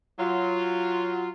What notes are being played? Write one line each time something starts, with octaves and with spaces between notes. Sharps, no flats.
F#3 F4